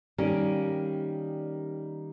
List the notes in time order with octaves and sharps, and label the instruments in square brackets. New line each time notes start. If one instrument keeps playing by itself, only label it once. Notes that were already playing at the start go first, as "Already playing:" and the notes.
[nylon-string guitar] D#3 G3 A#3 C#4